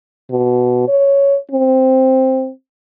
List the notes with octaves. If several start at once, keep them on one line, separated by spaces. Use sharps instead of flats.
B2
C#5
C4